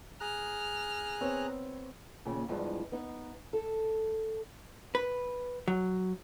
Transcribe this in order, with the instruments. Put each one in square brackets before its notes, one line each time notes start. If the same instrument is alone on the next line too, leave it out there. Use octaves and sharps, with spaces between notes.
[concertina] G#4 A#5 F#6 [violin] F6
[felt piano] B3 C4 C#5
[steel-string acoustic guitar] D#2 A#2 C#3
E2 G2 F3 G#3 D#4
B3 D#4
A4
[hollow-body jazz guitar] B4
F#3